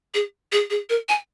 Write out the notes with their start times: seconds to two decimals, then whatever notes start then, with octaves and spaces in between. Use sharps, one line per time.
0.14 G#4
0.52 G#4
0.70 G#4
0.90 A#4
1.09 G#5